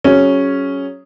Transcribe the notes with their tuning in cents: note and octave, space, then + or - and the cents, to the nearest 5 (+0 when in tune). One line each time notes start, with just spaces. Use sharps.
F#3 +0 C#4 +0 G#4 +0